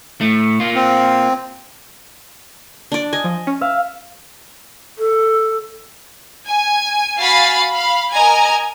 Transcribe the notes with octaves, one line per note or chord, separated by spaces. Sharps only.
A2 A3
A#3 F4
C4
D4 D5
D#5 G#5
F3
C#4
E5 F5
A4
G#5
F#4 F5 G#5 B5 A6 C7
F5 B5
A#4 D#5 G#5 A#5 G#6